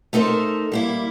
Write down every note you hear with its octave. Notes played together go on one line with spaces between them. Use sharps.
A3 D#4 A4 A#4 C5
G3 A#3 E4